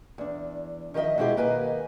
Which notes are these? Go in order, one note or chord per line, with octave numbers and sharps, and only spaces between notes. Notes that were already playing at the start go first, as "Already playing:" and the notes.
E2 D4
D#3 F3 B4 D#5 E5
B2 G#3 C4 E4 G4 G#4
D#3 A#3 B4 D#5 G#5